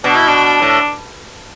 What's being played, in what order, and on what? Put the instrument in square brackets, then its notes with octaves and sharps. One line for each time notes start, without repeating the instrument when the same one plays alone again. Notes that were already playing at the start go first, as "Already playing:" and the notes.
[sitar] B2 [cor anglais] D4
[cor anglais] E4
D4
[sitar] A2